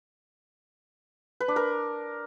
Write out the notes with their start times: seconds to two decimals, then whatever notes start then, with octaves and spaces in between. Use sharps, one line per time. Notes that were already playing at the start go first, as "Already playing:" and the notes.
1.40 B4
1.48 D4
1.56 A#4